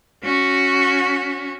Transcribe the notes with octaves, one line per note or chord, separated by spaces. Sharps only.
C#4 F#4